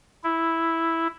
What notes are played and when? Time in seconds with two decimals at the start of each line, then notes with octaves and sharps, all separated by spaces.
0.24 E4